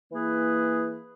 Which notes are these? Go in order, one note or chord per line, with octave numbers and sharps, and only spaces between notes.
E3 A#3 E4 G#4 B4